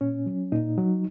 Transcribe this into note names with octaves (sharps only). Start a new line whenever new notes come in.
A#2 C#4
F#3
A#2 D#4
F#3